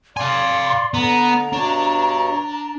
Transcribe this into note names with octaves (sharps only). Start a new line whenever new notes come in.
D5 F5 G#5 C6
D3 B3 A#5
G2 B2 D4 C#5